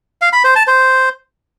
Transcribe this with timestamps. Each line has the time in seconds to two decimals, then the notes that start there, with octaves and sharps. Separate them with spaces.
0.21 F5
0.33 B5
0.44 C5
0.56 A5
0.67 C5